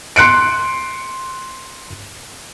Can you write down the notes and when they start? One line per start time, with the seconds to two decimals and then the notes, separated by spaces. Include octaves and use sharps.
0.16 C6 F#6 C#7 D7